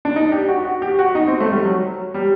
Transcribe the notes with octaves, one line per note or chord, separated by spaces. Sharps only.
D4
D#4
G4
F#4
F#4
G4
F#4
D#4
C4
A3
G3
F#3
G3